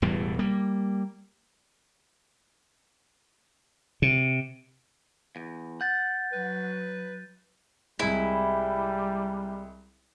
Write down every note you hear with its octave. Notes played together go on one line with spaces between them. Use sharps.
E1 E2 A2 G3
G3 A#3
C3
E2
F#5 G6 A6
F#3 B4
C2 G3 G#3 E4